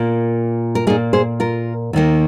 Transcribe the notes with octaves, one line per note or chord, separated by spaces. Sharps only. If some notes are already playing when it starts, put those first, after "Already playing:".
Already playing: A#2 A#3
A#4
A#2 A#3 D#4 G#4
G#4 C5
F4 A#4
D#2 D#3 A#3